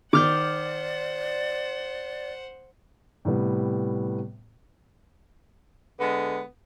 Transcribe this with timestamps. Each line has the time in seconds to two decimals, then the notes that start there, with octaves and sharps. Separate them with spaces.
0.13 D#3 C5 D5 F#5 D6 F6 G6
3.25 A2 C3 G3 B3
6.00 D3 G#3 B3